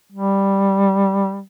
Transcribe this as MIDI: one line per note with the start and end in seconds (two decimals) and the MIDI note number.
0.12 1.41 55